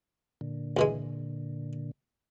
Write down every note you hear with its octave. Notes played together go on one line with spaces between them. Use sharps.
A#2 D3
C#2 E3 G#3